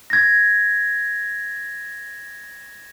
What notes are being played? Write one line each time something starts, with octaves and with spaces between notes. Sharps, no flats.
G#6 A#6